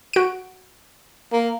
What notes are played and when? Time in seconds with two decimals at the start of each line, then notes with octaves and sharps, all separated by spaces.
0.13 F#4 D7
1.33 A#3